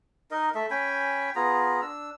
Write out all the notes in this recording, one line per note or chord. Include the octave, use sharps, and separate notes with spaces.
D#4 A#4 D#5
A3 A4 E5
C#4 G5 G#5 B5
B3 F4 G#4 A#5
D4 E6